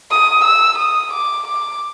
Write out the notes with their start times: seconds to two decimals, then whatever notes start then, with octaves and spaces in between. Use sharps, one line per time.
0.11 D#6
0.44 E6
0.78 D#6
1.13 D6
1.47 D6